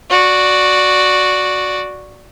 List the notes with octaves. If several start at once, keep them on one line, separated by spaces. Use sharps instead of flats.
F#4 D5